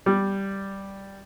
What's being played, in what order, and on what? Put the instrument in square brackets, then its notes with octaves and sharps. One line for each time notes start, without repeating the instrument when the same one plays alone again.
[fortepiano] G3